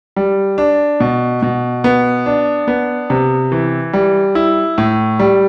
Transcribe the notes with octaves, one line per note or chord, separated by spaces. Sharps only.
G3
D4
B2
B2
B3
D4
B3
C3
E3
G3
E4
A2
G3